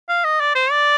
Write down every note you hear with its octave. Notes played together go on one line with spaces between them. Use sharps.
F5
D#5
D5
C5
D5